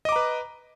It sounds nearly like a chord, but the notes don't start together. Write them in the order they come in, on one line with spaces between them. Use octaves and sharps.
D#5 D6 A#5 B4